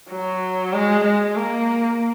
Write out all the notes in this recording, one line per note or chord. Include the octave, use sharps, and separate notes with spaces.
F#3
G#3
G#3
A#3